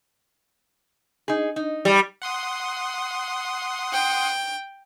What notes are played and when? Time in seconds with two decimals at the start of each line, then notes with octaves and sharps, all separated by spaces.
1.28 D#4 G#4
1.56 D#4
1.85 G3
2.22 F#5 C6 D#6
3.93 G5